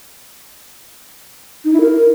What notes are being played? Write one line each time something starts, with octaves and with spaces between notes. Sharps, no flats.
D#4
E4
A#4